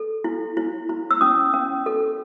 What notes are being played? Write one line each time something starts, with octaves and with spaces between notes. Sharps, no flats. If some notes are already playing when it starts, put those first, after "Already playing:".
Already playing: A4
E4
E4
E4
E6
C#4 D#6
C#4
A4